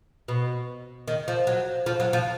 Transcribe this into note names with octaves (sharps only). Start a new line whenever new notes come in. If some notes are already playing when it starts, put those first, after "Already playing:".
B2
D#3
F3
F#3
F3
F#3
F3